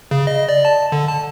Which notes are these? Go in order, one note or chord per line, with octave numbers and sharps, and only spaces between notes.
C#3
D#5
D5
A5
D3
A5